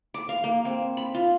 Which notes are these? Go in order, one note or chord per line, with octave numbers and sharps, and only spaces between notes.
D6
F5
A#3
C4
B5
F4